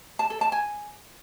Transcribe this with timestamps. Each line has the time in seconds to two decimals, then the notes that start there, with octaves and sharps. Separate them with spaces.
0.19 A5
0.30 A4
0.41 A5
0.52 G#5